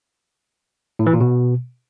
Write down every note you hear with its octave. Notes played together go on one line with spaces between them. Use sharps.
A2
E3
A#2
B2